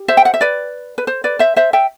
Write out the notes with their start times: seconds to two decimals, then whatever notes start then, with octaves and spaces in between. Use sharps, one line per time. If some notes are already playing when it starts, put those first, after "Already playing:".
Already playing: G4
0.08 C5 E5
0.17 G5
0.25 F#5
0.34 E5
0.41 B4 D5
0.98 B4
1.07 C5
1.24 B4 D5
1.39 C5 E5
1.56 C5 E5
1.73 E5 G5